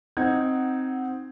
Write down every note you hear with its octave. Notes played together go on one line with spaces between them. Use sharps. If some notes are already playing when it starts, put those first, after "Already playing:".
C4 D#4 F#5 G#6